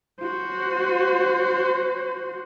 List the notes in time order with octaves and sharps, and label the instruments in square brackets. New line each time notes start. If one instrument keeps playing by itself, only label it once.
[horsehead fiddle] F#4 C5